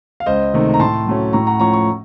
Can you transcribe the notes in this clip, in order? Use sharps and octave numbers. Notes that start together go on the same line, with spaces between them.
F5
C#2 C5 D#5
C3 D#3 A3 C4
A#5
A2 A5 C6
F#3 A3 C#4
A2 A#5 C#6
F#5 A#5
F3 A3 C#4 A#5 C#6
C#6